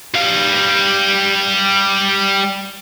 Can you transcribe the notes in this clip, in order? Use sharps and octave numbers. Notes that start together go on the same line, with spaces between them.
G3 F5